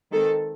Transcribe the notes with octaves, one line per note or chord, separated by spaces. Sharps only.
D#3 G#3 C4 A4